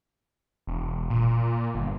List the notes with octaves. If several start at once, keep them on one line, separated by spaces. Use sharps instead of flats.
E1
A#2
G1